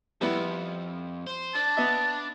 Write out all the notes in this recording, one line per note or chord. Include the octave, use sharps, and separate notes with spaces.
F2 G3 B3 E4
C5
D4 A5
B3 D#5 E5